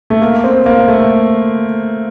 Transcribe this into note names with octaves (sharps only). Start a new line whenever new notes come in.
A3
A#3
C4
A#3
A3